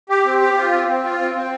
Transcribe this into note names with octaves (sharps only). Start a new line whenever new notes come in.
G4
C4
G4
F4
C4
C4
F4
C4
C4